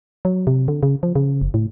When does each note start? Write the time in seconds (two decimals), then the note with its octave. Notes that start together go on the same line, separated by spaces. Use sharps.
0.25 F#3
0.47 C3
0.68 D3
0.83 C#3
1.03 F3
1.15 C#3
1.42 F#1
1.54 A2